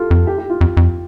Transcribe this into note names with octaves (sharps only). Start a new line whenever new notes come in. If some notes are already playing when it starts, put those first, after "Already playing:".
Already playing: F4 G4 A4
F2
G4
G4
F4
F2
F2